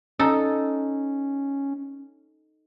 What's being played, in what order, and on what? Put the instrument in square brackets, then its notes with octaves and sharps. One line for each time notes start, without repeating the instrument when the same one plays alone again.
[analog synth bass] C#4 [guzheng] D#4 A4